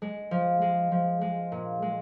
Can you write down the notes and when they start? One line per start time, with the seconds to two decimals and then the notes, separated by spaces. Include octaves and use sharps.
0.02 G#3
0.31 F3
0.62 G#3
0.92 F3
1.21 G#3
1.52 A#2
1.82 G#3